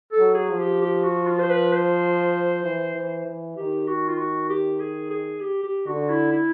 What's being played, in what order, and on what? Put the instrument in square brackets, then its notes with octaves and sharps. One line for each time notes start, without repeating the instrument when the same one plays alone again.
[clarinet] A4
[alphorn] F#3
[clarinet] G#4
[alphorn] F3
[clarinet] G4
G4
F#4
F4
C5
B4
C5
[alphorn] E3
E3
E3
[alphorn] D#3 [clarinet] G4
[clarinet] F#4
F4
F#4
G4
G#4
G#4
G4
G4
[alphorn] D3 [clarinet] F#4
[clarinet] E4
E4